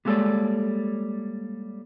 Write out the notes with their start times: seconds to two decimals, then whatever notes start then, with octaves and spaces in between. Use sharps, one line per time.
0.05 G3 G#3 A#3 A4 C#5 D5